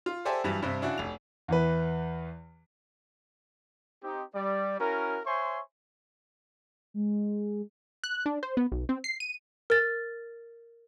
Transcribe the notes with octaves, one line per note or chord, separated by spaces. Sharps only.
F4
G4 A4 C5 D5 E5 G#5
G2 E3 F#3 G3
G2 C3
C#3 D4 E4 F#4
F1 F7
E2 E3 B4
C4 D#4 G4
G3 D5
C#4 E4 F#4 A#4
C5 C#5 E5 G#5 C6 C#6
G#3
F#6
D4
C5
B3
B1
C4
C7
D#7
A#4 A6